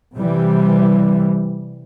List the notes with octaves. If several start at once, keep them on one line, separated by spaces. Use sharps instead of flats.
C3 E3 G3